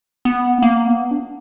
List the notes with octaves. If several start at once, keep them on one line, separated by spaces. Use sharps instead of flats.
B3
A#3
B3
D4